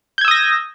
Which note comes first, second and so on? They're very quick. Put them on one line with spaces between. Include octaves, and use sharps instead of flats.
G6 G#6 E6 D#6 A#6